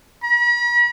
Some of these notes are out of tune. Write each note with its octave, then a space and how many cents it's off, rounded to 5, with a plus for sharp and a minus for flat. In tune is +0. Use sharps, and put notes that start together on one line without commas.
B5 -45